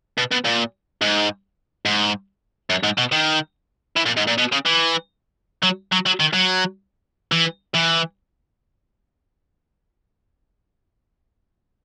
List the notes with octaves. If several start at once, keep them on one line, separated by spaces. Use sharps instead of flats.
B2
B2
A#2
G#2
G#2
F#2
G#2
B2
D#3
E3
A#2
G#2
A#2
B2
C#3
E3
F#3
F#3
F#3
D#3
F#3
E3
E3